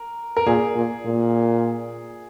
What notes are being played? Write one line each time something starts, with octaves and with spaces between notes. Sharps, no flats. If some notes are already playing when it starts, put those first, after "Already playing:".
Already playing: A#4
A#4
A#2 G#4
A#2
A#2